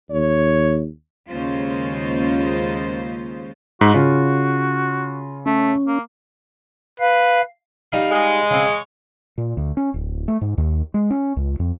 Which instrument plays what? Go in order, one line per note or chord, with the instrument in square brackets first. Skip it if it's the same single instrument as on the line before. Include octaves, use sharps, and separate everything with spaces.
[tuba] D#2 [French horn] C#5
[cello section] D#2 C#3 G#3 C#4 F4 C5
[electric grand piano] G#2 [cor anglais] F#4
[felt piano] C#3 [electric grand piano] F4
[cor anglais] A3 [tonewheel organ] C#4
[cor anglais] A#3
[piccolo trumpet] B4 [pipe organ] F5
[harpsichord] G3 D#4 F5
[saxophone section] G#3
[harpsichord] C#3 C4
C#5
[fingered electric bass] A#2
D2
C#4
D1
A3
G#2
D#2
G#3
C#4
C#2
F2